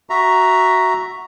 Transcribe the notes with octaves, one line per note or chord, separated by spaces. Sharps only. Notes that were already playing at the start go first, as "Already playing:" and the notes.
F#4 E5 A#5